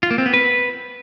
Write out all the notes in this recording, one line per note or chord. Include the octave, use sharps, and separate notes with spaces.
F4
A#3
C4
B3
B4